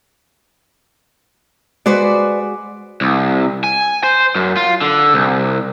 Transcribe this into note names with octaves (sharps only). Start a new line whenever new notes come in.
G#3 F#4 B4 C5 D5
C2
G#5
C5
F#2
F4
D3
C2